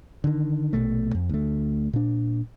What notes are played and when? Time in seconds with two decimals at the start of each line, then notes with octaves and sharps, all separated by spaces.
0.24 D3 D#3
0.73 A#1 B2 A3
1.15 F2
1.29 D2 A3
1.93 A#2 D4